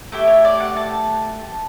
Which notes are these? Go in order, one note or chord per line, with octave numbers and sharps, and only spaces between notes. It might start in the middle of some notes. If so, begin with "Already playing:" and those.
A3 E4 G4
C#5
D5
F#5
A5